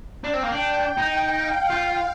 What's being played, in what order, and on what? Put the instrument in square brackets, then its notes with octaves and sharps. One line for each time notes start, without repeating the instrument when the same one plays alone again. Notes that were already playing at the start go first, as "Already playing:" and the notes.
[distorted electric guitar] D4 [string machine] G5
[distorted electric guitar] C4
A#3
D4
D#4
[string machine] F5
[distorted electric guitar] F4 [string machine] F5